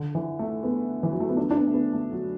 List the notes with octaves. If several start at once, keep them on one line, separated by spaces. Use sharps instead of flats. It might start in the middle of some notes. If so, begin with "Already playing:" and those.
Already playing: D3
E3
A3
B3
E3
F#3
A3
B3
D4
D4
B3
A3
B3
A3
F#3